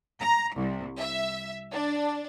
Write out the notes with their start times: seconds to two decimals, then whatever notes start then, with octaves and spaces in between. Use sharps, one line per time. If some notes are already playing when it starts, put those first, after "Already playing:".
0.21 A#5
0.54 C2
0.99 E5
1.72 D4